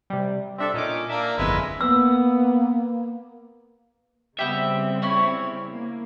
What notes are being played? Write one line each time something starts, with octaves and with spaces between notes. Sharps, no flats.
C3 G3
C4 D4 A4 E5
A#2 C#4 D#4 D6
A#3 D4 E5
G1 C2 F2 G#3 B4 E5
A#3 B3 E6
C#3 G3 B3 C4 G4 E5
C#4 E4 C#5
A#3